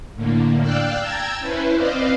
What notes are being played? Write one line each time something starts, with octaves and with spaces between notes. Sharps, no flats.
A2 D3 A#3
D5 F5 G5 E6 F#6
G5 A5 A#5 E6 G#6 A6
C#4 E4 B4 C5
C4 B4 C5 D5 D#5 F5